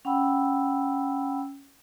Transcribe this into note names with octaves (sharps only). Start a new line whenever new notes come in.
C#4 F#5 G5 B5 E6